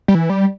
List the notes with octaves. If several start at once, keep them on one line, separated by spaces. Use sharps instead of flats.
G3
E3
G3